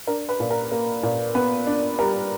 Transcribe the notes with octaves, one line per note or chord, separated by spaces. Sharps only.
D4 A#4 A#5
B4 B5
A#2
A#4 A#5
A#3
A#2
B3 B4 B5
D4
G3 A#4 A#5